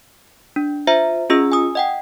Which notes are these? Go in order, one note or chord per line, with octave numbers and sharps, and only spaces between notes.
D4
F4 C5 E5 A#5
C#4 F4 G#4 D#5 E6
G#5 D#6
D#5 F#5 G5